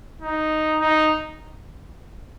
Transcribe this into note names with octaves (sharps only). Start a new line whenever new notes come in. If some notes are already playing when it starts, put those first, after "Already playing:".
D#4
D#4